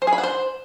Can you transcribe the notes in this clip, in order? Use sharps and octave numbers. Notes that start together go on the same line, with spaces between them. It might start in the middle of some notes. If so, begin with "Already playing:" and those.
C5
G#4
B5
F#5
C5